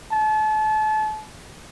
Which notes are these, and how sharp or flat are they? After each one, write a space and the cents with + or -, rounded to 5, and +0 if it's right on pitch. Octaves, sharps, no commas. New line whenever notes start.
A5 -35